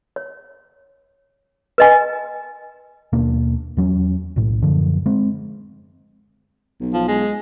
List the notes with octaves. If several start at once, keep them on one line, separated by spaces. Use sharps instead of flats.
C#5
B4 D#5 G#5
D#2 B2 A#3 D4
E2 F#3 C#4
B1 A2
F#2 D3 F3
G#3 C4
B1
F3
G#3